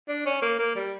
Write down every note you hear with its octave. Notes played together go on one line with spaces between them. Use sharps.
D4
C#4
A#3
A#3
G3